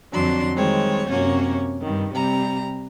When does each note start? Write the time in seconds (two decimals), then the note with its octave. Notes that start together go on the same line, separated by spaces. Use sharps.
0.12 F2 D3 F#3 D4 C6
0.56 D#3 G3 G#3 C4 C#5
1.09 F#2 C3 A#3 C#4 F#4 C#5
1.81 G2 D#3
2.13 C3 G3 A#5